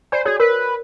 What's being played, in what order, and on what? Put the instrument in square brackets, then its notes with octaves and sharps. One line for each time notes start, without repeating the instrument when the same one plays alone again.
[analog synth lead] C5 [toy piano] D5 G#5 B5
[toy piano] F#4 C#5 [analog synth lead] G#4
[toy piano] A#4 [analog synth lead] B4